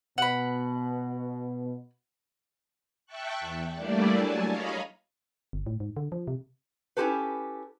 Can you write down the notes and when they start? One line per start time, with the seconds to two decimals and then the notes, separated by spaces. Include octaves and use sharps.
0.18 B2 F#5 B5
3.06 E5 G5 A5 C#6 F#6
3.40 E2
3.74 G3 A3 A#3 D4 E4 D5
4.13 F#3 G#5 A5
4.47 C#5 D#5 F5 A#5 B5
5.53 G1
5.67 A2
5.80 G#2
5.97 D3
6.12 F3
6.28 C3
6.97 C#4 E4 F#4 G4 A4 B4